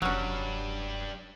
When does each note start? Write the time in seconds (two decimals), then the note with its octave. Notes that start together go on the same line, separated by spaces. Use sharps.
0.02 F1 G2 F#3 G3 C#4 D4